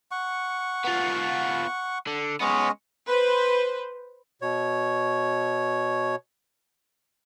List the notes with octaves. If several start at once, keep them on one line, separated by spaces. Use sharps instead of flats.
F#5 C#6
B3 F4
D3
G#3 B3 C#4 C#5 D#5
B4 C5
B2 C#5